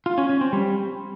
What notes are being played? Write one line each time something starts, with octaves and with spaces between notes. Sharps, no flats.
F4
C#4
C#4
C4
G3